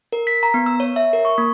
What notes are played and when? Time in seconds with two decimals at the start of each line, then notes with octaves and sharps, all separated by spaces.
0.13 A#4
0.27 B6
0.43 A#5
0.54 B3
0.66 E6
0.80 C#5
0.96 E5
1.13 A#4
1.25 C#6
1.38 A#3